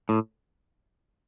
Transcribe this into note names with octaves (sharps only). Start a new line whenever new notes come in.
A2